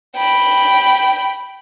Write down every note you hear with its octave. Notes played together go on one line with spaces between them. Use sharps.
G5 B5